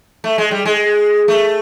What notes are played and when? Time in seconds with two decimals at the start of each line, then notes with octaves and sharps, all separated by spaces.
0.24 A3
0.38 G#3
0.51 G3
0.65 G#3
1.28 A3